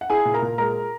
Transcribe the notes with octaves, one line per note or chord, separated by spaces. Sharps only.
F#5
E4 G#4 G#5
A#2
A#4 A#5
A#2
G#3 A#4 A#5